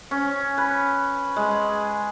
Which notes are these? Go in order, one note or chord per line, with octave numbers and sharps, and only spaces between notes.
C#4
B4
G#3